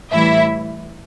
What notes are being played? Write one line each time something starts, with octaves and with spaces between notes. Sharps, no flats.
A2 E3 G3 E4 E5